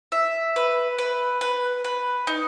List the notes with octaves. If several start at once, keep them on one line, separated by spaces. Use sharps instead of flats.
E5
B4
B4
B4
B4
D#4